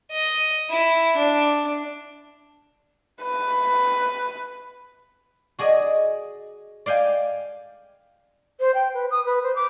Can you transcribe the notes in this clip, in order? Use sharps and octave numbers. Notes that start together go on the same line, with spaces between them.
D#5
E4
D4
B4
F#4 G#4 D5 D#5
D5 F5 G5 G#5
C5
G5
B4
D#6
B4
C5
D6